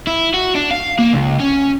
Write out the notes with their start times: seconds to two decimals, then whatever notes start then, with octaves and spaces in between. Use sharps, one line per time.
0.07 E4
0.34 F#4
0.55 D4
0.71 F5
0.99 A#3
1.13 C#2
1.40 C#4